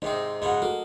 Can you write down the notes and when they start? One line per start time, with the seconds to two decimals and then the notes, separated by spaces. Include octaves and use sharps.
0.02 G#2 C3 C4 D#4 D#5
0.42 G#2 C#3 G#3 D#5 F#5
0.62 A#3 F#4 A4